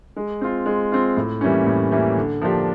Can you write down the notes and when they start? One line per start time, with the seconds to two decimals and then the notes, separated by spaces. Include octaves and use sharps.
0.16 G#3
0.41 C4 F4
0.66 G#3
0.92 C4 F4
1.17 A2
1.41 E3 G3 A#3 C#4
1.66 A2
1.91 E3 G3 A#3 C#4
2.17 D3
2.41 F3 A#3 D4 G4